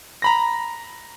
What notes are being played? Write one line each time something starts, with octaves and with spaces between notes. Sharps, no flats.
A#5 B5 A#6